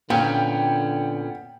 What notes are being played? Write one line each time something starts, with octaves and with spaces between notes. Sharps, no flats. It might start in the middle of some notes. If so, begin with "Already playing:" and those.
A#2 D3 B3 C#4 G5